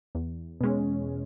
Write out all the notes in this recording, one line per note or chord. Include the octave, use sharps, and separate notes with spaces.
E2
B2 G#3 C#4